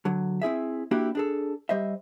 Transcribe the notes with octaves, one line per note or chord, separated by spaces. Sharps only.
D3 F#3
C4 E4 G#4 E5
A#3 D4 E4 F#4 G4
D4 G#4 A4
G3 C5 D#5 E5